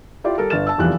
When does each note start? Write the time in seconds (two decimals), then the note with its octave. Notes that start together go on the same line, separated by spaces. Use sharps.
0.24 E4 F4 G4 D5
0.38 G3 A4 A#4
0.50 G1 B4 E5 F6 A6 E7
0.67 A5 E6
0.78 F1 E2 E3 F3 G3 F#6